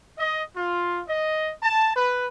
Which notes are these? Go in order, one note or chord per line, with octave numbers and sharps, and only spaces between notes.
D#5
F4
D#5
A5
B4